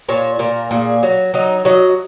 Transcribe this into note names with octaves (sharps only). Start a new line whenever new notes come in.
A#2 C#5
A#2 A#4
A#2 G#4
F#3
F#3 D#4
F#3 D#5